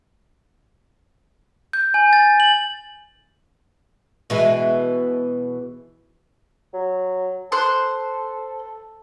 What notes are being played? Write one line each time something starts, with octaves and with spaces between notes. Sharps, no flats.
G6
G#5
A6
F#7
B2 E3 G#3
F#3
A4 C5 C6 F#6